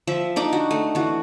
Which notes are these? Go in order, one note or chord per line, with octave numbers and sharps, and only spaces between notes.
F3 E5
D4 D#4 D6
F#4
A3
E3 F#4